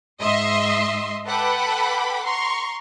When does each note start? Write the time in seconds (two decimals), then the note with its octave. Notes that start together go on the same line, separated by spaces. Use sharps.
0.21 G#2 D#5 E5 C6 C7
1.26 A4 B4 F#5 G5 B5 D6
2.24 A#5 C6 C#6